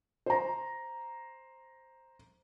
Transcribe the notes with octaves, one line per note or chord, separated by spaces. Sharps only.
C5 A#5